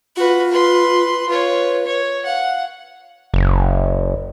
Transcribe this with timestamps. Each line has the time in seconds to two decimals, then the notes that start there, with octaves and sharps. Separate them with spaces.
0.16 F4 F#4 B4
0.52 B4 C6
1.29 F4 B4 C#5
1.87 C#5
2.26 F5 F#5
3.34 F#1